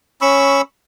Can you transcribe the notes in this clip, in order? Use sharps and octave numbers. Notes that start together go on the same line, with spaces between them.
C#4 B5 C#6 E6